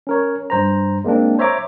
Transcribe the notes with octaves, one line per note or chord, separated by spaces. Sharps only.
C#4 A#4 C#5
G2 C5 A#5
G#3 A#3 C4 D4
C5 C#5 E5 A#5 D6